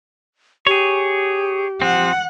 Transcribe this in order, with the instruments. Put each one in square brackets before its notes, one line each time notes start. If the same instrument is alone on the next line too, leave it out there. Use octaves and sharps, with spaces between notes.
[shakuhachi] G4 [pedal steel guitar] G#4 C#5
[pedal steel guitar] F3 C4 [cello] F#5